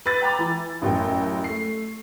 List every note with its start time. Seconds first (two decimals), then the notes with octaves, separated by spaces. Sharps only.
0.06 B4 E6 A6
0.22 G5 A#5 B5 D6
0.39 E3
0.82 A1 F#2 G5
1.44 A3 C7